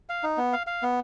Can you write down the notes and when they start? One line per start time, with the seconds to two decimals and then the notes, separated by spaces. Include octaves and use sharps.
0.09 F5
0.23 D#4
0.37 B3
0.53 F5
0.67 F5
0.83 B3